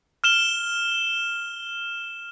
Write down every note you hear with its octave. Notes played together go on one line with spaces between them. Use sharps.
F6 E7 G7